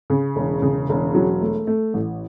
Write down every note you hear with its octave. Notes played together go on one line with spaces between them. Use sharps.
C#3
E1
C#3
E1
F#3
A3
A3
A1